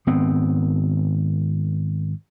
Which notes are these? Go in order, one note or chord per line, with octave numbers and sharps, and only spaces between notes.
G#1 B3 C4